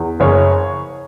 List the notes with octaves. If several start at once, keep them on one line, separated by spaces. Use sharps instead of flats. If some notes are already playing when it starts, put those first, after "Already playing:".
Already playing: E2
F#1 G#4 C#5